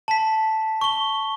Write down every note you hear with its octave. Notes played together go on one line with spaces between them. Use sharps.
A5 B6
C#6 G7